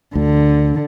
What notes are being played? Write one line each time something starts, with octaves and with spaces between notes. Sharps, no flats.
D2 D3